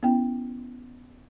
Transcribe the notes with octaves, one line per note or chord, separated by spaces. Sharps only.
B3 C#4 E4 G5